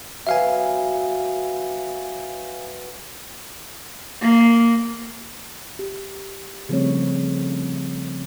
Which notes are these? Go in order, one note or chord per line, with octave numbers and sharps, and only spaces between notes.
F#3 B3 E5 F5 G#5
A#3
G4
C#3 F3 G3 A3 C4 C#5